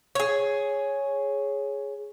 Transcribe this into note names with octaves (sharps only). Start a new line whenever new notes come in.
G#4 C#5